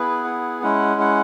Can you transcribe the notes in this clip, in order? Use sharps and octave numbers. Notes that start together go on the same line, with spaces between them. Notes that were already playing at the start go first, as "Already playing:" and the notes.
Already playing: B3 E4 G#4 B4
F#5
G#3 C#4 E4 F#5
F#5